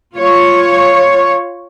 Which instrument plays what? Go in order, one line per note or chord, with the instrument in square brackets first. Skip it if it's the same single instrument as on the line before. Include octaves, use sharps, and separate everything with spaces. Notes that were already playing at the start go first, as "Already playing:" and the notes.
[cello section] F4 C#5